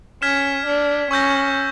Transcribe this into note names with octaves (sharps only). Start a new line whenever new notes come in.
C#4 F6 G#6 B6 E7
D4
C#4 C#6 E6 G6 A#6